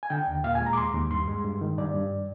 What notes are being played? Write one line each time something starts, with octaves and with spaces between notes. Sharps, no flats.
G#5
D3 G5
D#2
A#2 F5
G#5
G#3
A#5
D6
D#2 C6
D#2
G2 C6
G#3
G2
D#3
G2 D5
G2